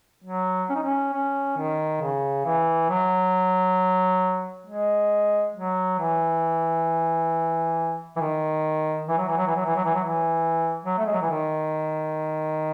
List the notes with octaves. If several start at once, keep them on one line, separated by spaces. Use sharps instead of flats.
F#3
C#4
D#4
C#4
C#4
D#3
C#3
E3
F#3
G#3
F#3
E3
E3
D#3
E3
F#3
E3
F#3
E3
F#3
E3
F#3
E3
F#3
E3
F#3
A3
G#3
F#3
E3
D#3